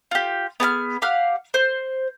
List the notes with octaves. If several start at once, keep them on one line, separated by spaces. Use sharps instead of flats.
F4 G4
B3 G#4 A5 F6
G4 F5 F#5 F6
C5